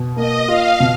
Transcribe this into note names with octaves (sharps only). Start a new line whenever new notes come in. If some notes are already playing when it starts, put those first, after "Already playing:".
Already playing: B2
A#3 D#5
F4 F5
B2